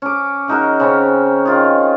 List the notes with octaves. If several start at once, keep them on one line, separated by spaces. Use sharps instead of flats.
C#4 D6
C#3 D#4 F#4 A#4
C#3 C4 C#4
D#3 F4 G#4